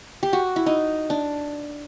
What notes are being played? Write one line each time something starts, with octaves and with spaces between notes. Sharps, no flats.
G4
F#4
E4
D#4
D4